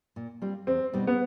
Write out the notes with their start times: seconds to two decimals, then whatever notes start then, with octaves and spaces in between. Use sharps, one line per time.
0.16 A#2
0.42 G3 C4 F4
0.67 E2 C4
0.93 B2 G3 B3 D#4
1.07 B3